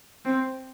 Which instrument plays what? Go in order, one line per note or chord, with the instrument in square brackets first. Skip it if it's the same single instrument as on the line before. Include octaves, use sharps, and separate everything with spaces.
[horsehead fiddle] C4